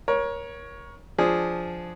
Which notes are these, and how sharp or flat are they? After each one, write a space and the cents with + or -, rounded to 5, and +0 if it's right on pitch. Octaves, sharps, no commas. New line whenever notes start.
A#4 +30 C#5 +0
F3 +0 D4 +0 G#4 +0